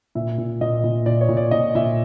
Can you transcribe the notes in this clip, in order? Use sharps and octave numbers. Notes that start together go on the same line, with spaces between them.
A#2 E5
A#2
A#2 D#5
A#2
A#2 D5
C#5
A#2
D5
A#2 D#5
A#2 E5